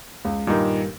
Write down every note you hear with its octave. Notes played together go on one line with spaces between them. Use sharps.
C#2
G2 A#2 D#3 A#3 D#4